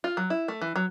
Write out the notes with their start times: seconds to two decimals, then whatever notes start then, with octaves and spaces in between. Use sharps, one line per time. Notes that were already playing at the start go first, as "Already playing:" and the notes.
0.04 F4
0.17 F#3
0.30 E4
0.48 A3
0.61 E3
0.76 F#3